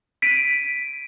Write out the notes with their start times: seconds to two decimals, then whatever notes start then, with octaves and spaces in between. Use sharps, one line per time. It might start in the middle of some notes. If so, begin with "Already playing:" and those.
0.22 B6 D7 D#7